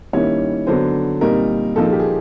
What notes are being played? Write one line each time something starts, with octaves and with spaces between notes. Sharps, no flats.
D#3 G3 A#3 C#4 E4 C#5
D3 F#3 B3 D4 C5
A#2 G3 C4 D#4 A#4
A#2 F3 A#3 D#4 A4
G#4
G4
G#4